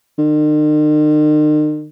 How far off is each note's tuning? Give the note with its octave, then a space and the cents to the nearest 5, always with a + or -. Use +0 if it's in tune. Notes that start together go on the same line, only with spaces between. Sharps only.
D#3 -45